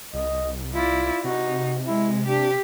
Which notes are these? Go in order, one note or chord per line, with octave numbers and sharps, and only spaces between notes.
C2 D#5
E4 F4 D5
C3 D#4 F#4
G#3 E4
D4 G4